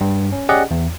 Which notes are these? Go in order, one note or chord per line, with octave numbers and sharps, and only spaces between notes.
G2
C#4
C#4 G4 G#4 D5 D#5 F#5
E2